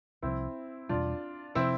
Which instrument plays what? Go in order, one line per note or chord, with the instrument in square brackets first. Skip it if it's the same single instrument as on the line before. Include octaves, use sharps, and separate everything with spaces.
[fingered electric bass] C2 C3 F3 [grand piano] C4 E4
[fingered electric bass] E2 B2 G3 [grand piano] D4 F4
[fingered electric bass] C3 F3 [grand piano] C4 E4